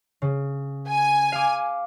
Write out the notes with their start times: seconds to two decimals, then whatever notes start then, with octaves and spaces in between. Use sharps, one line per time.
0.22 C#3
0.88 G#5
1.32 F5 D6